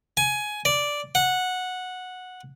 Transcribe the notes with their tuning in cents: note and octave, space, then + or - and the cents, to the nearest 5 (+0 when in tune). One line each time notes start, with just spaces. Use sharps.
G#5 +15
D5 -5
F#5 -10